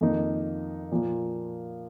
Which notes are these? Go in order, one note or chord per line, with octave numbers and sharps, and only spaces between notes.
F2 D#3 A#3 D#4 A#4
A#2 F3 A#3